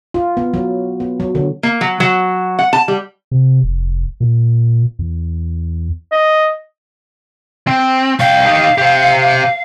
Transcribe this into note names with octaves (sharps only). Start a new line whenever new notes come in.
F4
B3
F#3
B3
F#3
D3
A#3
F#3
F#3
F#5
A5
G3
C3
F1
A#2
E2
D#5
C4
C2 F5 G5
D#4 G4
G4 C5